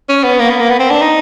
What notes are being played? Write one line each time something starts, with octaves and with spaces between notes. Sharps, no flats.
C#4
B3
A#3
B3
A#3
B3
C4
D4
D#4